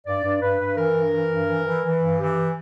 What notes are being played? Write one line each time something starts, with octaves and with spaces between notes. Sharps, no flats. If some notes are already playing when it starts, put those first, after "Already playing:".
G2 D5
G2
G2 B4
G2
E3 A#4
G2
E3
G2
E3
E3
E3
G2
E3 G4